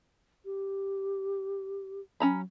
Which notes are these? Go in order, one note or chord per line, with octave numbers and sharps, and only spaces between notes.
G4
F#3 C#4 A#5 B5